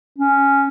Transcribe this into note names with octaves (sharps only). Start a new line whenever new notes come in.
C#4